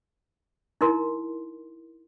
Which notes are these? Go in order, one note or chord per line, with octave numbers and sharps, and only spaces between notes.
D#4 E4 A#4 C6